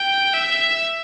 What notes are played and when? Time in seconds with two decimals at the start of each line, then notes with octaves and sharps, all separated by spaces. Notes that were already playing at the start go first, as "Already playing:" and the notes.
Already playing: G5
0.34 E5